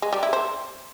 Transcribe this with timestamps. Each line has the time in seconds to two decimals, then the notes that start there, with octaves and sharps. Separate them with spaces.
0.02 G#3
0.13 G3
0.23 E4
0.33 C5